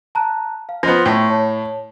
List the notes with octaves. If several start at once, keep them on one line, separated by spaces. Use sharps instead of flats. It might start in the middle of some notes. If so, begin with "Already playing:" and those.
A5 A#5 F#6
F5
F3 B3 D#5 C6 A#6
A2 G5 C#6
C#5 A5